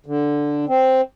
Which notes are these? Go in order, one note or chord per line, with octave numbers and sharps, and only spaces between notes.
D3
C4